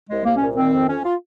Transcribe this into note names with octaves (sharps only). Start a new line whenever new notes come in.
C2 G#3
C2 A#3
A#2 C#4
D#3 C4
F2
F2 C#4
F4